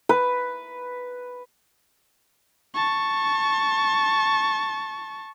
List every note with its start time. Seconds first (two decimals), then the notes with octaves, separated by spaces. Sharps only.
0.09 B4
2.75 A5 C#6